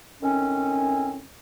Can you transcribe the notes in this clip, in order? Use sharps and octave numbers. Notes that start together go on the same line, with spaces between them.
A2 D#3 C4 C#4